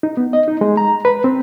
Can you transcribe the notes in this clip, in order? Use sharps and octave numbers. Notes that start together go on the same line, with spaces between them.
D#4
B3
D#5
D#4
G#3
A#5
B4
C4